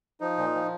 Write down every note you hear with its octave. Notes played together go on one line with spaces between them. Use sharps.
F3 D#4
A#2
F3